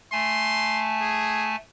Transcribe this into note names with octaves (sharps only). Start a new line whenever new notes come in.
A3 G#5 A5 C6
G#4